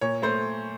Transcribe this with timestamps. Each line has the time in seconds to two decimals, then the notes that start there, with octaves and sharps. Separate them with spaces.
0.01 A#2 C#5
0.22 A3 C5